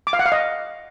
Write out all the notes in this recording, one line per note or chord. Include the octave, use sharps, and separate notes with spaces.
D6
F5
F#5
F5
D#5